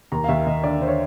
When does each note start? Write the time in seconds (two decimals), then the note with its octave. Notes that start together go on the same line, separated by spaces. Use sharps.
0.12 D#2 A#5
0.24 F5
0.28 D#2 E5
0.46 D#2 D#5
0.64 D3 D5
0.81 D3 C5
0.88 C#5